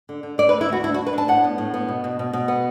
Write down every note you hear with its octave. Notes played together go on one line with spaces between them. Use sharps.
D3
D3
D3 D5
B4
D2
E4
D2 F#4
D4 E4
F#4
D4
B4
D4 A5
A2 F#5
B3
A2
B3
B2
B2
B2
B2
B3